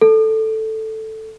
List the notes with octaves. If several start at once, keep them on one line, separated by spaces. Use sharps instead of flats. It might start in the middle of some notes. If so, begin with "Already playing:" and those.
A4